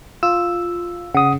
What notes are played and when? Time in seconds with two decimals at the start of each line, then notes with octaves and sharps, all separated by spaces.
0.23 F4 E6
1.15 C#3 F#5 D#6